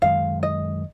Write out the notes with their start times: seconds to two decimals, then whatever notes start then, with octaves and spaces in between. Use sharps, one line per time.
0.02 F#2 D#3 G#3 F5
0.43 D#5